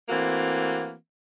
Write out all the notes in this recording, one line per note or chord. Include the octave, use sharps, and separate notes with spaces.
E3 A3 A#3 C4 F#4